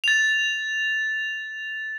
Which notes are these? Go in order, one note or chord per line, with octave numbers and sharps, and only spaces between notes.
A6 F7